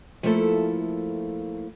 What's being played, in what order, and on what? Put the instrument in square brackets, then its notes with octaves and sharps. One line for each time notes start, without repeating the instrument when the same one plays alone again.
[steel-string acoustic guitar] F3 A3 A#3 E4 A4